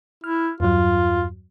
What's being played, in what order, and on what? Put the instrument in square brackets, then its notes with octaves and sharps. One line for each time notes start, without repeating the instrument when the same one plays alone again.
[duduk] E4 [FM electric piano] F6
[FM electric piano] E2 G2 F#3 [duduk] F4